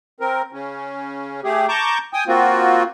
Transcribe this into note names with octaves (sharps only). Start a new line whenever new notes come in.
C4 A#4
C#3 C#4
A3 G4 G#4
A5 A#5 C#6 D6 G6
G5 G#5 D#6
A#3 C4 F4 F#4